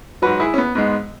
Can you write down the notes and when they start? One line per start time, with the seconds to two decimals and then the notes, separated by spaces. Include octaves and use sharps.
0.22 G#2 F#3 F#4 B4
0.40 E4 G#4
0.54 C#4
0.58 B3
0.75 G#2 G#3 B3